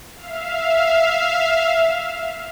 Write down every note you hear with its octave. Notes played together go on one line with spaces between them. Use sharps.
E5 F5